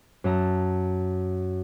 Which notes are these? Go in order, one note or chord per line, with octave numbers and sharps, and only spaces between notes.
F#2 E5 A5 A#5